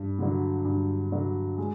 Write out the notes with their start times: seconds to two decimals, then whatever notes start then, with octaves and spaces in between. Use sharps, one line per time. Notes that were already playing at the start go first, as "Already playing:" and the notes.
Already playing: G2
0.19 D3 F#3
0.65 G2
1.12 D3 F#3
1.57 G#3